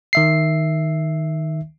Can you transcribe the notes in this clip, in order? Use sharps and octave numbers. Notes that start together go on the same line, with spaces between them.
D#3 E5 C7